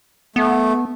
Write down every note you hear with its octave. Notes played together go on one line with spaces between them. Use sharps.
A3 B3